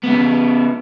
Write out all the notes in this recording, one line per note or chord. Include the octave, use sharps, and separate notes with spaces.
C#3 B3